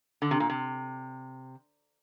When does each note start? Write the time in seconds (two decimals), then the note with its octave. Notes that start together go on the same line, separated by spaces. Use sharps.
0.22 D3
0.31 C3
0.40 A#2
0.50 C3